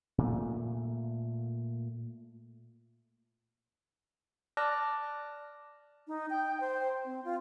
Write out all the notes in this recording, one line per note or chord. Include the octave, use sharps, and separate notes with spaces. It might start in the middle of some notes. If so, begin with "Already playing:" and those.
A#2 A3
D5 A5 D6 F6 F#6 A#6
D#4
G5
C5
C4
F4